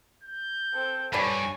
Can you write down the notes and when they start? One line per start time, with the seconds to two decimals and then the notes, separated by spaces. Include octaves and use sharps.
0.23 G6
0.73 C4 A4
1.13 G2 A4 B4 C#5 D5 G#5